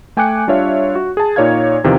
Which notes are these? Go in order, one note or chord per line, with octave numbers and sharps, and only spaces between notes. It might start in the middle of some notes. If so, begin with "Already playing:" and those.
A3 G5 G#5 D6 F#6 C#7
G3 D4 F4 C#5 E5 F5
F#4
G#4 A5
A#2 D#4 C#5 D5 F5 G#6
E2 C3 D#3 F3 F5